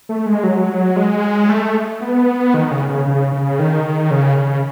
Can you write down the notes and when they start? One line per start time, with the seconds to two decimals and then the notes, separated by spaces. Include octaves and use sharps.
0.09 A3
0.26 G#3
0.43 F#3
0.96 G#3
1.49 A3
2.01 B3
2.54 D#3
2.71 C#3
2.89 C#3
3.06 C#3
3.33 C#3
3.59 D#3
4.11 C#3
4.38 C#3